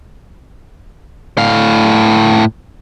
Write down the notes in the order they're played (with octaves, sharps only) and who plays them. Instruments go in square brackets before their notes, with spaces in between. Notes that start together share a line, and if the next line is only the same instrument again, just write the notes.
[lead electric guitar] A2 F5